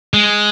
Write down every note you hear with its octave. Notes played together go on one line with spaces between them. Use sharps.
G#3